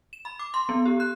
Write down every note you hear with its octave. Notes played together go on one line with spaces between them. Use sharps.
E7
B5
D6
C6
B3
G4
F#6